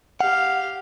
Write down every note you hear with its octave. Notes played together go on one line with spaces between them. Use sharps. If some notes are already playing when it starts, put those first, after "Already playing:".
G4 F5 F#5